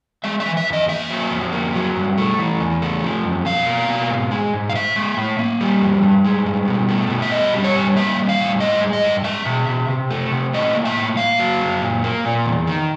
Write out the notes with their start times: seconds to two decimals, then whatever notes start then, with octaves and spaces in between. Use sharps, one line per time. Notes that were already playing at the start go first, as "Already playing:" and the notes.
0.24 G#3 E5
0.40 E5
0.46 E3
0.57 E5
0.67 E2
0.73 D#5
0.88 A#3 E5
1.10 F#3
1.32 F2
1.52 A#3
1.74 F#3
1.96 G2
2.18 A3
2.39 E3
2.60 E2
2.82 A3
3.02 F3
3.24 F#2
3.45 B2 F5
3.67 A#3
3.88 B2
4.10 G#2
4.31 G#3
4.54 G#2
4.70 F5
4.75 A2 E5
4.96 G#3
5.17 A2
5.39 A#3
5.61 G3
5.81 F2
6.03 G2
6.25 G#3
6.46 G2
6.68 B2
6.89 A3
7.10 B2
7.22 E5
7.31 G2 D#5
7.54 G3
7.64 C#5
7.75 G2
7.96 A#3 E5
8.17 G3
8.29 F5
8.39 A2
8.60 G2 D#5
8.81 G#3
8.93 D#5
9.03 G2
9.24 G#3 E5
9.46 B2
9.68 B2
9.88 C3
10.11 A3
10.32 C3
10.53 A2 D#5
10.74 A#3
10.85 E5
10.97 A2
11.17 A#3 F5
11.39 F#3
11.61 F#2
11.82 A#2
12.04 A#3
12.25 A#2
12.46 E2
12.67 D#3